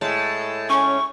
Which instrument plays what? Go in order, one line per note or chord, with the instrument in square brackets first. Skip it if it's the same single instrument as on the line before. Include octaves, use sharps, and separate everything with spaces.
[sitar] A2 G#3 [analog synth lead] A5
[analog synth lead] C#4 [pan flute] C#6